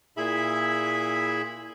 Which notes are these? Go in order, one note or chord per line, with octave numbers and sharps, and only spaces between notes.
A#2 E4 G#4 E5 B5